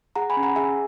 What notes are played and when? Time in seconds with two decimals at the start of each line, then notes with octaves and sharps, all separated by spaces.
0.16 G#4 F#5 A#5
0.30 G#5 B5
0.37 C#4
0.43 F#5 A#5
0.56 G#4 E5 G#5